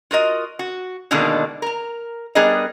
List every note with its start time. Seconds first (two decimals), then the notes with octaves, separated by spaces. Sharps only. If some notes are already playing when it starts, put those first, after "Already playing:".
0.11 F4 F#4 A#4 D#5
0.59 F#4
1.11 B2 D3 D#3 G#3 A#3 D4
1.62 A#4 A#5
2.35 G3 B3 D4 G#4 A#4 D#5